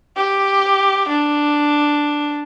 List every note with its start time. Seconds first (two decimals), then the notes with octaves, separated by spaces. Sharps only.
0.17 G4
1.08 D4